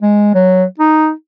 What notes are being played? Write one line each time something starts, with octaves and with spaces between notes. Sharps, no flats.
G#3
F#3
D#4